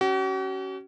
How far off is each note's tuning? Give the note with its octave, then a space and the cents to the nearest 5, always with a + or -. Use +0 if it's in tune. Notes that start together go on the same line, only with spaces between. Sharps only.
C#4 +0 F#4 +45